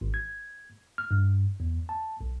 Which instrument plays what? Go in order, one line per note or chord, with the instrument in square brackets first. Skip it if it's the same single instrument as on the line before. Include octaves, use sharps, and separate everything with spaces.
[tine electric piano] G#1
G#6
F6
G2
E2
A5
B1